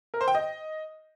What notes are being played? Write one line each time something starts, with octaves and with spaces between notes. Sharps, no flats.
A#4
C5
G5
D#5